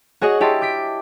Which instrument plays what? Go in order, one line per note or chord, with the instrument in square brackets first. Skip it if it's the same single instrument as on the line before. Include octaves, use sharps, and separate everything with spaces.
[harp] F#4 G#4 C#5 D#5 F#5
E4 G4 D#5 A5 C6
D6 G6 B6 D7